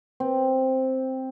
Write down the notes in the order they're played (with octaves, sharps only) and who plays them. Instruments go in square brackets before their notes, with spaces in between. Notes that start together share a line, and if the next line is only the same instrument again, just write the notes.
[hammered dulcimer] C4